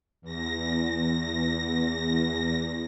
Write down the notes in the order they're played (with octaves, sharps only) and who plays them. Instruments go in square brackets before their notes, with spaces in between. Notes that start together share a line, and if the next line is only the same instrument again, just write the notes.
[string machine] E2 A#6